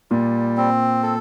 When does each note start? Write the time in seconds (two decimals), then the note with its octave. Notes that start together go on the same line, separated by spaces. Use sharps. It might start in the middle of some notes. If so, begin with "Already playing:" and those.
0.11 A#2 G3
0.57 C4
1.03 A4